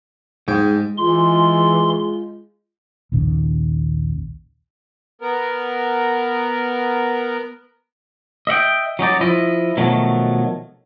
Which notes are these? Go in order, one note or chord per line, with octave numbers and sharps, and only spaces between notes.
G#2 G#3 G5
E3 G#3 F4 C6
A#1 D#2 C#3
B3 A#4
D#5 E5 F#5 G5
F#3 C#4 D#4 D5
F3 E4 D#5
B2 D#3 F3 F#3 A3